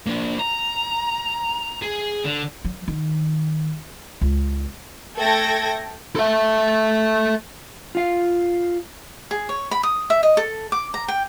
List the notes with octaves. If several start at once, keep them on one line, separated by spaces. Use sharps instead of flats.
A#3 D4
A#5
G#4
D3
F#3
D#3
C#2
A3 A4 G5 G#6 A#6
A4 E5
F4 F5
G#4
C#5
B5
D#6
E5
D#5
A4
D6
A#5
G5